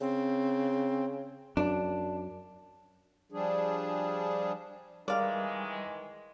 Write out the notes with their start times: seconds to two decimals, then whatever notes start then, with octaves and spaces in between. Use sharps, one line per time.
0.01 C#3 C4
1.57 F#2 D4
3.32 F3 G3 D4 G#4
5.08 D#3 E3 G3 G#3 A#4 D5 F5